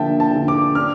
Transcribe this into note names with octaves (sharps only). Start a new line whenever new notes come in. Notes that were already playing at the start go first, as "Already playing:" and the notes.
Already playing: D3 F3 A#3 E5 G5 A5
A5
D3
D6
D4 F6